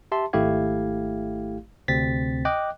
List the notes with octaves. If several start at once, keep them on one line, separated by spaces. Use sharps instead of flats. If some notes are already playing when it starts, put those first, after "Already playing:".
G4 E5 A5 C6
G#1 A3 E4 G4 F5 G#6
D2 C3 C4 A6 B6
D#5 G5 D6 F#6